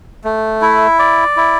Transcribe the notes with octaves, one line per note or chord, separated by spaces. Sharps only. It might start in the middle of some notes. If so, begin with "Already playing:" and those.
A3
E4
D5
E4